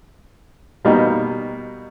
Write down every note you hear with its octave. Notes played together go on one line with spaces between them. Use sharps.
B2 G3 A#3 D#4